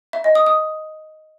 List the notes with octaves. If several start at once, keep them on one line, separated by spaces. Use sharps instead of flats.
E5
D#5
D#6
D#6